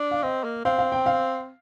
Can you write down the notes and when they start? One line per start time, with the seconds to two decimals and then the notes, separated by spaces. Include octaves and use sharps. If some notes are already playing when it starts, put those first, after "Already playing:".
Already playing: D4
0.11 F5
0.22 C4 D#5
0.44 A#3
0.65 C4 F5
0.79 F5
0.92 G5
1.06 F5